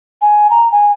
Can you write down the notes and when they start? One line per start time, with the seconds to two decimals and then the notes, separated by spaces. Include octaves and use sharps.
0.22 G#5
0.50 A#5
0.72 G#5